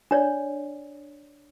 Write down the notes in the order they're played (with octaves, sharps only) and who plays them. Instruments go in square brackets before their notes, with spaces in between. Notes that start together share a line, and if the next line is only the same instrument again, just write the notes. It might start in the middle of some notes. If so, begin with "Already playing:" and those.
[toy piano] D4 C#5 D5